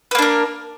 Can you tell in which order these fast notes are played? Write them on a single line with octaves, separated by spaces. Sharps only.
B4 A#3 D4 A#4